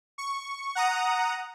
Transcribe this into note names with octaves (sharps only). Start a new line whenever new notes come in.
C#6
F#5 A#5 D#6